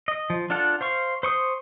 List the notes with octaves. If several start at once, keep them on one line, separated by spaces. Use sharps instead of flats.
D#5
F3
D4 F4 A4 F#5 A5
C5 F5 C#6
C5 C#6 D#6